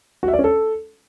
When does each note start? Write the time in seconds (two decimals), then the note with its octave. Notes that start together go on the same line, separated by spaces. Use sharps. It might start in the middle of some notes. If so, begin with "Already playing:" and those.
0.23 F#4
0.28 E5
0.33 D5
0.39 C#4
0.44 A4